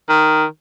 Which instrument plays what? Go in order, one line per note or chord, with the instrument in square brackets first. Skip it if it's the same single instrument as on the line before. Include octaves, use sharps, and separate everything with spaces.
[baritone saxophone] D#3